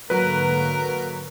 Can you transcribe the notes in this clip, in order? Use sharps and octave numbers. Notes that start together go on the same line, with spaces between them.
G#2 D3 F#3 A#3 A#4 B4